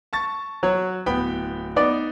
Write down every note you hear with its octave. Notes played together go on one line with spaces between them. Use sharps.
A5 C#6 A6
F#3 F#4 C#5
D1 B3 G5 B5
B3 D#4 D5